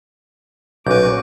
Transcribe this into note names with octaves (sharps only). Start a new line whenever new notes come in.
B1 A#2 C#4 F#4 B4 D6 G6